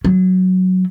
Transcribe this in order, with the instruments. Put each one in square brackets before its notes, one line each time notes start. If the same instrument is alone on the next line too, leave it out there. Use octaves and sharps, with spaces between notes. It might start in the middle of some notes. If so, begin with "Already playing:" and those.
[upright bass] F#3